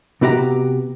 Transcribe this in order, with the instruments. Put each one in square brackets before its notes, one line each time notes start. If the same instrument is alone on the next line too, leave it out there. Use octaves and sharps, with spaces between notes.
[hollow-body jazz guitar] C3 B3 F#4 G4 E5 A#5